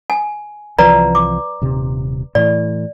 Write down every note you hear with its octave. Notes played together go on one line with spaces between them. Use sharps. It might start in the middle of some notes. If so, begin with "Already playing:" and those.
G#5
C2 E3 F3 B4 D5 A#5
D6
D#1 C3
A2 E3 D5